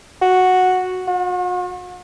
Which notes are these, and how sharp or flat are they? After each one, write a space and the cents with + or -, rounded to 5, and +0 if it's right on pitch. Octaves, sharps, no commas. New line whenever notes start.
F#4 -5
F#4 -45